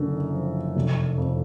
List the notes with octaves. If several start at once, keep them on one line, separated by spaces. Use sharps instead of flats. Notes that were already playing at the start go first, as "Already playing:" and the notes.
Already playing: F#1 F#2 D3
F3
F1
F2